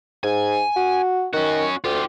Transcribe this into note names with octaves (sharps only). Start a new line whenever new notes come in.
G#2 G#5
F#4
D#3 C#4 F#4
D2 F4 G4